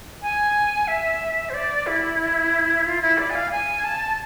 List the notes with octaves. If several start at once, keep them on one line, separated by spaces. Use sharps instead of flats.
G#5
E5
C5
D5
E4
F4
E4
D5
G#5
F5
G#5
A5